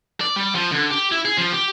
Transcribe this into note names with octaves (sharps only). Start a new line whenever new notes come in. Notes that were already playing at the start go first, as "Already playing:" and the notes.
D5
G3
F3
D3
G4
E4
G#4
F3
G4